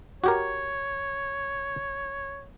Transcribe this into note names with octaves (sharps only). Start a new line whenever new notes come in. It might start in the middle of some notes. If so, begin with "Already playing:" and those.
F#4 G4 A#4 C#5